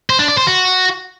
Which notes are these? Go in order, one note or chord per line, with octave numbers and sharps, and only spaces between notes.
C5
D4
D5
C5
F#4